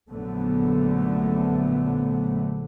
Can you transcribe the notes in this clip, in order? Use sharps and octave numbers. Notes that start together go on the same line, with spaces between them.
A#1 F#2 D3 A3 B3